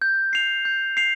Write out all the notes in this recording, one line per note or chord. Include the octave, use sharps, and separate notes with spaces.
G6
C7 F7
G6
C7 F7